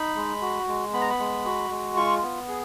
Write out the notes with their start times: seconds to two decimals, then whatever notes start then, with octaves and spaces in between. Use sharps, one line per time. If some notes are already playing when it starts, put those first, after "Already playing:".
Already playing: D#4 B5
0.16 G#3
0.41 F#4
0.68 G#3
0.93 B3 B5
1.01 A#5
1.10 B5
1.19 G#3
1.45 F#4
1.70 G#3
1.96 F4 C#6
2.23 B3
2.48 G#4